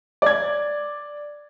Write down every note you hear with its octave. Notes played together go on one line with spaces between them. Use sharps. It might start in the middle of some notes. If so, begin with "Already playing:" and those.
D5 G#6